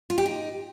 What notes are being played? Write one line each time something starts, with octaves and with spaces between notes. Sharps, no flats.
F4
G4
D#4